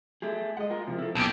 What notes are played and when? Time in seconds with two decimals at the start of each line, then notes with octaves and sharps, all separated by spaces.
0.22 A3 G4 G#4
0.57 G#3 D#5 F#5
0.70 F4 A#4
0.87 C3 F3
0.99 E4 A4
1.15 B1 A#2 G4 A5 G6 D7